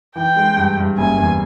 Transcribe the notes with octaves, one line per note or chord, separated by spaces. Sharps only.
E3 G5
G#3
G2
G2
F#1 G#5
E2